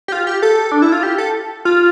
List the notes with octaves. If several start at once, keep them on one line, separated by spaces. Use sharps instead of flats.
G4
F4
G4
A4
D4
E4
F4
G4
A4
F4